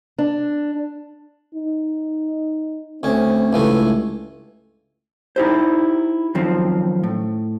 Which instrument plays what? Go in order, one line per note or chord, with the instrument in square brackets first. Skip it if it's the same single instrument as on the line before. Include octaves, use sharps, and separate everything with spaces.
[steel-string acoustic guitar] D4
[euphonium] D#4
[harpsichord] D2 C#4 [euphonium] C4
[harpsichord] C#2 E3 A3 [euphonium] G2
[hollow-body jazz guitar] D#4 E4 G4 C5
F#2 D#3 F3 C4
A2